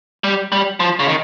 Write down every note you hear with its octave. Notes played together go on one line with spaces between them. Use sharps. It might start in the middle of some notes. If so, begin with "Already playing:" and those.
G3
G3
F3
C#3
D#3